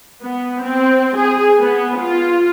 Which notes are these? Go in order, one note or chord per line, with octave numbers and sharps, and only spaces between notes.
B3
C4
G#4
B3
F4